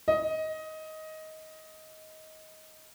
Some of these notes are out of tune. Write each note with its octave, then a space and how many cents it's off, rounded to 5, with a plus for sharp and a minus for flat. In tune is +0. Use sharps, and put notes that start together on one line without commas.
D#5 +15